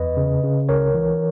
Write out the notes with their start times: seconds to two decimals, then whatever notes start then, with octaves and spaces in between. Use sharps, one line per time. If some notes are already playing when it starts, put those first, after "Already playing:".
Already playing: E2 B4 D#5
0.17 C#3
0.44 C#3
0.69 C#2 A#4 C#5
0.94 E3